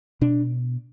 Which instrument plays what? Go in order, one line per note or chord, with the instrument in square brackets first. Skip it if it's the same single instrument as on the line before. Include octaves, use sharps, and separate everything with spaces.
[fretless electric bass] B2 D4